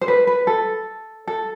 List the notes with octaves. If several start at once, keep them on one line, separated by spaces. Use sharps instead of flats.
C5
B4
B4
A4
A4